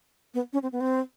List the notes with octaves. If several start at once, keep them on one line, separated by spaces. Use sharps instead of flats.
B3
C#4
C4
B3
C4